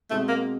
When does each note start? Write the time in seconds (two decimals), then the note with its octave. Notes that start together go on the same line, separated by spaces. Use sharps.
0.10 B2 G#3 A3 C4
0.28 A#3